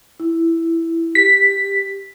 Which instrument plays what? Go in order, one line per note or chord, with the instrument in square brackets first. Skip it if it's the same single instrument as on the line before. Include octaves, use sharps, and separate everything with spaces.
[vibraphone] E4
[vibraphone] G4 [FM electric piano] B6